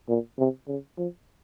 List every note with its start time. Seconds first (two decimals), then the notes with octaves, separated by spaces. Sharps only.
0.09 A#2
0.39 C3
0.68 C#3
0.98 F3